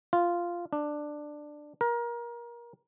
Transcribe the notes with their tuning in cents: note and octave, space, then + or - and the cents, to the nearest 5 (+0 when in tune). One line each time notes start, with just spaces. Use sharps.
F4 -5
D4 +15
A#4 +25